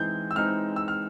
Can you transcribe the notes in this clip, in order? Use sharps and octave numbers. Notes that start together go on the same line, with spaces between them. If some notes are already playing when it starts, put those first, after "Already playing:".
Already playing: E3 G#3 C4 D#4 G6
E6
E3 G#3 C4 D#4 F6
E6
F6